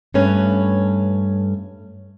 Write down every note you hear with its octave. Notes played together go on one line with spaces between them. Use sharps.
G2 A3 C#4 B4 C#5